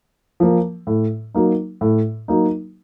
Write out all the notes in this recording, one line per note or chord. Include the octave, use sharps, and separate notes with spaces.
F3 A#3
A2
F#3 A#3 D#4
A2
F#3 A#3 D#4